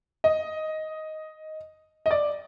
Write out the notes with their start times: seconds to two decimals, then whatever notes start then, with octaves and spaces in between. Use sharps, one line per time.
0.24 D#5
2.06 D#5
2.11 D5